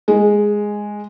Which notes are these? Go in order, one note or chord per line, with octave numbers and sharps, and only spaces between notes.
G#3